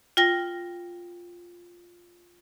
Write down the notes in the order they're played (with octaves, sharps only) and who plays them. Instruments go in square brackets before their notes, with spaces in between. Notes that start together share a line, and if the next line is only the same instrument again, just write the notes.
[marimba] F4 G5 A#6